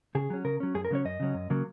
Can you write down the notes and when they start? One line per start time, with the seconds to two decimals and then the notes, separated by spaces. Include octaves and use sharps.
0.15 C#3 G#4
0.30 F#3 C#4
0.45 C#3 A#4
0.60 F#3 C#4
0.75 F#2 G#4
0.85 A#4
0.90 C#3 F#3 C#4 C#5
1.05 F#2 D#5
1.20 C#3 F#3 C#4
1.34 F#2
1.50 C#3 F#3 A#3